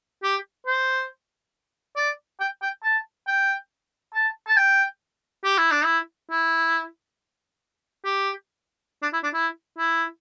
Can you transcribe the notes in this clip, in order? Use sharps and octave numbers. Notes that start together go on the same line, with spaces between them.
G4
C5
D5
G5
G5
A5
G5
A5
A5
G5
G4
E4
D4
E4
E4
G4
D4
E4
D4
E4
E4